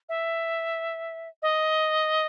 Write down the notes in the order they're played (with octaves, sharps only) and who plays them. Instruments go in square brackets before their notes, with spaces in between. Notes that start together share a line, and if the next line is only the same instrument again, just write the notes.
[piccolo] E5
D#5